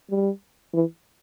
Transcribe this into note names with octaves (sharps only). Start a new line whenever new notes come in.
G3
E3